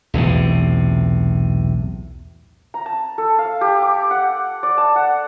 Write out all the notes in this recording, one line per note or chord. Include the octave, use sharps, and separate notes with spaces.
B1 E2 A2 C3
A#5
A5
A4
F5
G4
D6
F#5
D5
A5
F#5